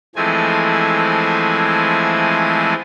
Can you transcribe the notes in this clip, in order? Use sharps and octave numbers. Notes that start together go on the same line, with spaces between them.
E3 F3 G#3 A3 C4 G#5